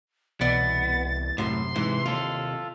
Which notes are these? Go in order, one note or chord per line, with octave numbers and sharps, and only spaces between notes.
C2 B2 E3 B3 D5 A6
F#2 A2 C3 C6
G#2 E3
D#2 F4 A4